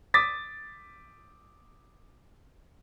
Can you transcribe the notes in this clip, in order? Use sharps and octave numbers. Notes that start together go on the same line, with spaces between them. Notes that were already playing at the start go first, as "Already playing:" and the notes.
D6 D#6 A6 B6